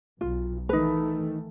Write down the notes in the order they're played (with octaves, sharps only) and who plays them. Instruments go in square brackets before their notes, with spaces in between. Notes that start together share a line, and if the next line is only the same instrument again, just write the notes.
[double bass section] B1 [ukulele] F4
[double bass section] D#3 E3 A3 [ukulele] D#4 B4